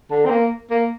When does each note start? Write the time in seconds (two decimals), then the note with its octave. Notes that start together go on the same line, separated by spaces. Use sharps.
0.11 D3
0.26 C4
0.31 A#3
0.71 A#3